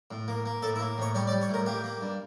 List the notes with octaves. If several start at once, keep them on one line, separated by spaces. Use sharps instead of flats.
A2
A#3
A#3
A2 A4
E4
A#3
A2 C#5
G3 C#5
D5
G3
C#5
A2 A#4
A#3 G4
A#3
G2